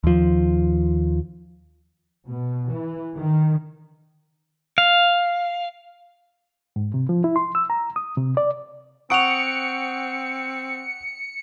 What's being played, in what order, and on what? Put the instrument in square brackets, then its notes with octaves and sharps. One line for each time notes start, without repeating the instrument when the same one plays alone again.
[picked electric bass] D#2 F3
[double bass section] B2
E3
D#3
[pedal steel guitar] F5
[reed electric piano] G#2
C3
F3
E4
C6
E6
A#5
D#6
C3
D5
[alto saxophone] C4 [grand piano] F#5 C#6 D#6 [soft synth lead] C#7 [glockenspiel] D7 F7